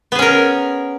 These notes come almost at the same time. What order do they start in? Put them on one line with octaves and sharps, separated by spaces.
B3 G#4 C#4 A#4